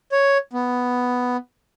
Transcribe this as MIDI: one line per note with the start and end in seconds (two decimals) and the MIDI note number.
0.12 0.38 73
0.53 1.37 59